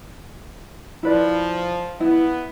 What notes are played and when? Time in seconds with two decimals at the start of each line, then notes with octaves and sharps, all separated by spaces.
1.03 F3 E4 B4 D5
2.00 B3 E4